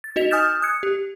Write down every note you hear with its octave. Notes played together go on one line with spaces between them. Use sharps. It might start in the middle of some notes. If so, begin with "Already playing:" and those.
A6
D#4 F#4 D#5 B6 F7
G#5 D#6 F6 G6 A6 E7
D#6 F#6 G#6 C#7
G4